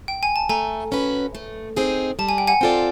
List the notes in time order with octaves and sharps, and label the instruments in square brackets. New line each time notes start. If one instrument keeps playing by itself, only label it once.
[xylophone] G5
G#5
A5
[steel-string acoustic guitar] A3 [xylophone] G#5 A#5
[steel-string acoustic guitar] C#4 F#4 B4
A3
C4 D#4 G#4
[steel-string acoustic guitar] G3 [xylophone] A5
[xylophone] G#5
G5
F#5 G#5
[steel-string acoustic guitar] C4 F4 A4 D5